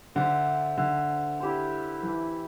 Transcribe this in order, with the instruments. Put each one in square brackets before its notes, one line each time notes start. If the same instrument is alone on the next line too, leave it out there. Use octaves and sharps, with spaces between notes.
[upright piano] D3 [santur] D4 C5 E5
[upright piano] D3
[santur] E4 G4 C5
[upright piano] E3